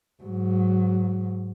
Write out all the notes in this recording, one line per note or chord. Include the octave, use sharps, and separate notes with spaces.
G#2 F#3